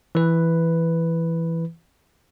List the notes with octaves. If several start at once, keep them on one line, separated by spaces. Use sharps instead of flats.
E3 B4